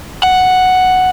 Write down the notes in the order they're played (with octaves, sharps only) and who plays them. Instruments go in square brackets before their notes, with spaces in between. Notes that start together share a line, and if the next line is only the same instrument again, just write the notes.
[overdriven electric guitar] F#5